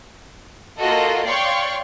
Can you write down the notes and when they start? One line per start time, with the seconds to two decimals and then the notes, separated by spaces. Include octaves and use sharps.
0.78 A#3 F4 F#4 A4 D#5
1.26 C#5 D5 F5 G5 C6 C#6